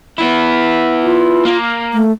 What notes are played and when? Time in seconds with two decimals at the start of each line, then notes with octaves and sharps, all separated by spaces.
0.18 B3 E4
1.03 F4
1.45 A#3
1.94 A3